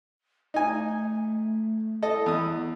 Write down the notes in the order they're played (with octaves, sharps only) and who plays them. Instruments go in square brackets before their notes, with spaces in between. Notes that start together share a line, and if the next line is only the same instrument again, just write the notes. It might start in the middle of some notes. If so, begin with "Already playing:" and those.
[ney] A3 [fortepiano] D#4 G#5
[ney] E4 [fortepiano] A4 D#5
[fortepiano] E2 D#6